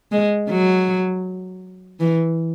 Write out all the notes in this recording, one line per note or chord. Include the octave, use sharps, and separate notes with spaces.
G#3
F#3
E3